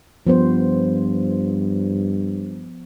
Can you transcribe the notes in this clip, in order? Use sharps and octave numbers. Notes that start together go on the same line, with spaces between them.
G2 F3 B3 C5